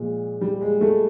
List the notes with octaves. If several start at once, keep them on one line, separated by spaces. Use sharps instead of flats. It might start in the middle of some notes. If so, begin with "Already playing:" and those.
Already playing: A#2 F3 G#3
G3
G#3
A3